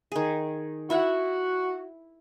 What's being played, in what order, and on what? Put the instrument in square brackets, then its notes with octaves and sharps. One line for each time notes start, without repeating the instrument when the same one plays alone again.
[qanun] D#3 G#4
[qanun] E4 E5 F#5 [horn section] F#4